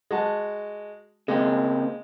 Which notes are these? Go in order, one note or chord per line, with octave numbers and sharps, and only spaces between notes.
G#3 F#4 A5
C#3 G#3 A#3 C4